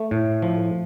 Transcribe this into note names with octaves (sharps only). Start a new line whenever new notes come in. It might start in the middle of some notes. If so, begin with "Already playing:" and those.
Already playing: A3
A2
F3